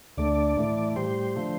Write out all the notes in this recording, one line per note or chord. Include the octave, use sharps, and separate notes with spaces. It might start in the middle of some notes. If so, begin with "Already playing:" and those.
D2 D3 A3 D5
A2 E3 A3
A2 G3 C5
D3 F3 A3